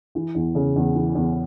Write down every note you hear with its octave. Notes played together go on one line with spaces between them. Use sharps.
E3
E2
C#3
E2
E3
E2